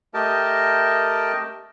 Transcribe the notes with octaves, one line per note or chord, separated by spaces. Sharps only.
A3 G4 A#4 D#5 G5 A5